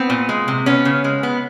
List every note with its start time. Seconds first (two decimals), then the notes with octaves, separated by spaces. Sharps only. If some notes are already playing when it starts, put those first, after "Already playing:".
Already playing: B3 C4
0.10 A#2
0.29 G#3
0.48 C3
0.66 B3 C#4
0.85 C#3
1.04 G#3
1.23 B3